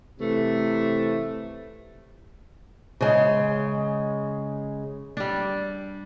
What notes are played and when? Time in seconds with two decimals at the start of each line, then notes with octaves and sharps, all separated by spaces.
0.20 C3 E3 A3
3.01 C#3 G#3
5.17 G3 D4